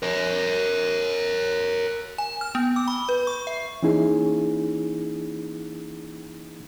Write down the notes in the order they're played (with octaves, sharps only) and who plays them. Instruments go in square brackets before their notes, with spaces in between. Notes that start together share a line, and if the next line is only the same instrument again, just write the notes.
[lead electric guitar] A#4 C#5
[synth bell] G#5
F6
B3
D6
B5
B4
C#6
E5
[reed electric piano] E3 A#3 C#4 D#4 E4 G#4